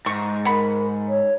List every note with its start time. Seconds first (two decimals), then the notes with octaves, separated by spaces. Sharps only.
0.06 G#2 C#6
0.45 A#4 F#5 B5
1.08 C#5